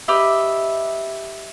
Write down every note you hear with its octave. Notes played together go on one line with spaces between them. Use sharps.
G4 B4 D#5 E5